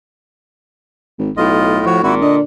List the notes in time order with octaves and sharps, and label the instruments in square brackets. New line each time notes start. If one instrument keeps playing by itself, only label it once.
[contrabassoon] G#1
[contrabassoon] B1 [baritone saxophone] A2 [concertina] F4 D#5
[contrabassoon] F3 [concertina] F#4 C#5
[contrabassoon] G#1 [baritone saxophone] A#2 [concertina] E4 F#4
[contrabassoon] D3 [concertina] D#5